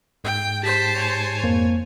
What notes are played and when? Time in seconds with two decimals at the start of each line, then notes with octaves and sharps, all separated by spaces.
0.24 G#2 G5
0.63 G4 C5 A5 B6
0.95 C#5 G#5
1.43 F2 A#3 C5